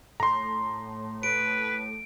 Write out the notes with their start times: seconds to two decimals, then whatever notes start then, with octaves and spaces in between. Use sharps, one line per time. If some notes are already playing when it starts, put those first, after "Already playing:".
0.20 A2 A#5 C6
1.23 B4 D7